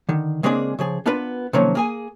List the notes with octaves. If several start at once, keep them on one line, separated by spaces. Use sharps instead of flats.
D3 D#3
C#3 G#3 A#3 C4 D4 G#4
C#3 F3 G#4
B3 D4 F4 A#4 B4
C3 D#3 F3 F#3 A#3 C#4
A#3 G#4 G#5